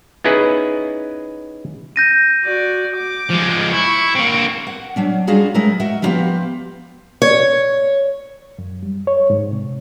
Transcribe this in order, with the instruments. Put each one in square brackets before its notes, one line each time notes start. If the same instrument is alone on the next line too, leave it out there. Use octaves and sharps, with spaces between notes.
[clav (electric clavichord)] B3 C#4 D#4 E4 G#4 B4
[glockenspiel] G6 A#6 D#7
[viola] F#4 D5
D6
[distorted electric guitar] F3 G#3
[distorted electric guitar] E4 [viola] C#6
[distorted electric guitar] A#3 C4 [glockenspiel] D7
[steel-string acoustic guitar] F#5
F#3 C#4 D4
G3 C#4 D4 F4 F#4 G#4
F#3 G#3 A3 E4 A#4
F#4 A#4 D#5 E5
F3 G3 A#3 B3 F4 G4
C#5
[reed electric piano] F#2
G3
C#5
G#2
C3